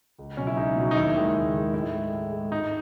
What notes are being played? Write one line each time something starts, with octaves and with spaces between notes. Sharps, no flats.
C#2
B2 F#3 C#4
E4
C#2 D#4
B2 F#3
D#4
D#2 E4
D#3 G#3
D#2
D#3 G#3
A2 E4
G#3
A2
G#3
G#2 D#4